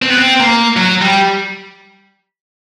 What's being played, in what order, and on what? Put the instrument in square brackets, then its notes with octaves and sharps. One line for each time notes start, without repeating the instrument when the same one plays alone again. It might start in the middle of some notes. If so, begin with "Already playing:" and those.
[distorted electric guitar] C4
B3
C4
A#3
F#3
G3